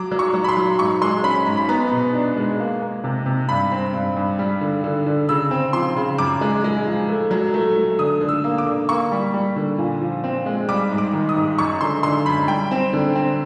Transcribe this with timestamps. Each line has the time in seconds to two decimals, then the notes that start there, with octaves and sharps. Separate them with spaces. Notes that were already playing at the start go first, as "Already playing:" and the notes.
Already playing: F#3 D6
0.12 F#3
0.19 C#6
0.34 F#3
0.44 B5
0.49 C6
0.57 F#3
0.79 G#2 C#6
1.01 G#3 C6
1.24 C#4 B5
1.46 G#2 A#5
1.57 B5
1.69 B3 A#5
1.91 B2
2.14 D4
2.36 G#3
2.59 A#3
2.81 A#3
3.04 C3
3.26 C3
3.49 G2 B5
3.72 C4
3.94 G2
4.16 G2
4.39 G3
4.61 D3
4.84 D3
5.06 D3
5.29 C#3 E6
5.51 C4
5.73 F3 C6
5.96 C#3
6.18 F#2 D6
6.41 G#3
6.64 G#3
6.86 F3
7.09 A3
7.31 F#3
7.54 A3
7.76 A3
7.99 D3 D#6
8.21 D3
8.29 E6
8.44 A#3
8.58 D6
8.66 D3
8.89 A#3 C#6
9.12 G3
9.34 G3
9.56 D3
9.78 A#2
10.01 F3
10.24 C4
10.46 G#3
10.69 G3 D6
10.92 G#2
10.98 D6
11.13 D#3
11.29 D#6
11.36 G#2
11.58 F#2 C#6
11.81 D3 C6
12.03 D3 C6
12.26 F#2 B5
12.48 G3 G5
12.71 C4
12.93 D3
13.15 C4